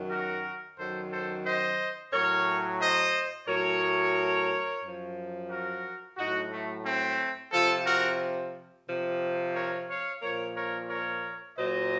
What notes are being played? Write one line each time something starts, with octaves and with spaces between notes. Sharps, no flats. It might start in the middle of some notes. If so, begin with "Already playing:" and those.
Already playing: F#2 D#3 F#3
F#4 A#4
F#2 D#3 F#3 A4 C5
A4 C5
C5 D#5
A2 F#3 A#4 C#5
C5 D#5
A2 F#3 A#4 C#5
F#2 F3
F#4 A#4
A2 F#3 D#4 F#4
A3
A3 C4
C3 F3 F4 A4
F#4 A#4
C3 F3
A#4 C#5
C#5 F5
A#2 F3 A#4 C#5
A#4 C#5
A#4 C#5
A#2 F#3 C5 D#5